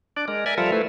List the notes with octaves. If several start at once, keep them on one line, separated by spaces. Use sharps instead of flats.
D4 D5
G#3 A#4
A#4 D5 E5 G#5
F3 G3 F4 A4 A#4 E5
A3 E4 A4 B4 C5